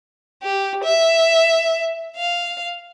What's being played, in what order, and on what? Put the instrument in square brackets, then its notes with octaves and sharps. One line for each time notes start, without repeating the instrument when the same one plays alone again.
[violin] G4
E5
F5